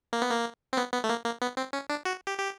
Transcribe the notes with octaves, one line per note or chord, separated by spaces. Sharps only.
A#3
B3
A#3
C4
B3
B3
A3
A#3
A#3
B3
C4
C#4
D4
F#4
G4
G4